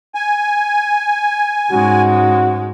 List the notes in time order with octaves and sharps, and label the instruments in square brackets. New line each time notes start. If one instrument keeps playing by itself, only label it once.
[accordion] G#5
[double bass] G#2 G#3 [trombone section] C#4 F#4